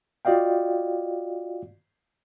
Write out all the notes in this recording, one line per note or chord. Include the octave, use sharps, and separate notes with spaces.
F4 F#4 D5 D#5 F5 G5